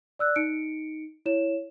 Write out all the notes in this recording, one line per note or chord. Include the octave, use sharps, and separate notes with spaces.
D5 E6 F#6
D#4 C#7 D7
E4 C#5 E7